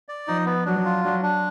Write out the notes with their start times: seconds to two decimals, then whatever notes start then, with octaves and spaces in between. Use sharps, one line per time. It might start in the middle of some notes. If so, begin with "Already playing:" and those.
0.08 D5
0.28 F3 D#4
0.46 B3
0.66 F#3 D4
0.85 F4
1.04 F#3 D4
1.23 D4